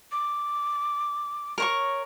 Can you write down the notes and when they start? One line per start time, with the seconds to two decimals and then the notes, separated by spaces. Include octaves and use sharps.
0.12 D6
1.58 A#4 C#5 C#6